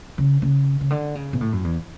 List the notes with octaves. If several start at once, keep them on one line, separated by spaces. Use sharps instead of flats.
C#3
C#3
C#3
D3
C#3
B2
A2
F#2
E2